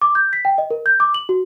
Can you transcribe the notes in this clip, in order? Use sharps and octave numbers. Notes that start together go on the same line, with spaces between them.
D6
G6
B6
G5
D#5
A#4
G6
D6
F#7
F#4